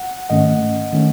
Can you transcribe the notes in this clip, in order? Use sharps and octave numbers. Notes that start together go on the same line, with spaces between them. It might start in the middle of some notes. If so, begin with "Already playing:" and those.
Already playing: F#5
G#2 D#3 A3 C#4 D#5 F#5
D#3 A3 C#4